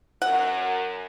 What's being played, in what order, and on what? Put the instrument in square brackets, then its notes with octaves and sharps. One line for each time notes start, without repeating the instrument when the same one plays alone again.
[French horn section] F#2 [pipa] F#5